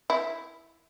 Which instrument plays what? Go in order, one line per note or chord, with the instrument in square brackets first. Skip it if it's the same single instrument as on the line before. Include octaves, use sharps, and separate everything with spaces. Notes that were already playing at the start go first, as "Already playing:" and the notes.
[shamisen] E4